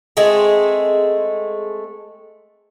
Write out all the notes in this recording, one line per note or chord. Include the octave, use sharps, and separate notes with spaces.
G#3 A3 C4 G#4